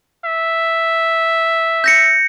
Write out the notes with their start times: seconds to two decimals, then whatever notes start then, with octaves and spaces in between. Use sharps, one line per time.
0.24 E5
1.84 G6 A#6 C#7